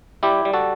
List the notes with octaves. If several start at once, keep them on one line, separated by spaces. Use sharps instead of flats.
G3 E4 G4
G3
F#4 A4